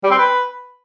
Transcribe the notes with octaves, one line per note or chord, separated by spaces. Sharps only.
G3
C4
B4